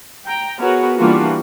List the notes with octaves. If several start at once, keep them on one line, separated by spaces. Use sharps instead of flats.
G5 A#5
B3 F#4 G#4 A#4 C#5
E3 G3 A#3 D4 F4 F#4